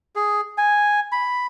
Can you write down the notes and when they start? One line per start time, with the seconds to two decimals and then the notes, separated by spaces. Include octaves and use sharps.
0.16 G#4
0.58 G#5
1.12 B5